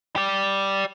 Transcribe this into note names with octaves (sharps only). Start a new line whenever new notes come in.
G4 D5